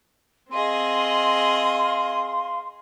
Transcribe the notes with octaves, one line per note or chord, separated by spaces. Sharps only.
C4 G#4 D#5 F5 C6